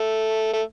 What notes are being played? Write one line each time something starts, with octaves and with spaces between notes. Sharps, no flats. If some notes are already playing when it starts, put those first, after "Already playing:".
Already playing: A3
A3